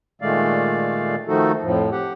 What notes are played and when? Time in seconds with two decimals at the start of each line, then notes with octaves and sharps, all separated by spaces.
0.22 A#2 D#3 G#3 A3 D5 F5
1.28 D#3 F3 A3 D#4 F#4 A4
1.63 F2 A2 F3
1.92 G4 F#5